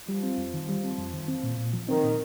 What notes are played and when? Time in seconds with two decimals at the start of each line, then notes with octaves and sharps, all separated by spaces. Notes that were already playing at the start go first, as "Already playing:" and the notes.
0.08 F3 G3
0.23 C4
0.38 F2
0.54 D#3
0.69 G3
0.84 C4
0.99 F2
1.13 D#3
1.28 C4
1.43 A#2
1.58 A#2
1.73 F3
1.88 D#3 C4
2.03 A#2